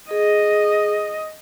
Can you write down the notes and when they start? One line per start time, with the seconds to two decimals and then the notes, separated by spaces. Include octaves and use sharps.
0.11 G#4 D#5